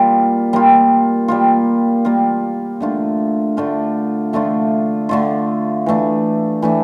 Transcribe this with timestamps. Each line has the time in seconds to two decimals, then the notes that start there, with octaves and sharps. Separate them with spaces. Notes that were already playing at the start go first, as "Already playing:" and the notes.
Already playing: G3 A#3 F4
0.53 G3 A#3 F4
1.28 G3 A#3 F4
2.05 G3 A#3 F4
2.80 D3 A3 D4 F4
3.57 D3 A3 D4 F4
4.33 D3 A3 D4 F4
5.09 D3 A3 D4 F4
5.86 E3 A3 D4
6.62 E3 A3 D4